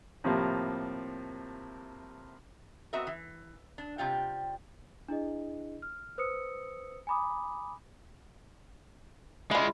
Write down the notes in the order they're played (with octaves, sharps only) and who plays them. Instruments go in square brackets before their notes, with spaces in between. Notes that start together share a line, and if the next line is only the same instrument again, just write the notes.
[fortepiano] A2 C3 F3 G3 A#3
[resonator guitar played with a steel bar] B3 C4 F#4 A#4 D#5 E5
E3
D4
C3 G3 F4 G5
[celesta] D4 E4 G#4 D#5
F6
B4 C5 D#6 E6 C#7
G#5 A#5 B5 D6 D#6
[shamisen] D3 E4 [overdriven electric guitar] G#3 F4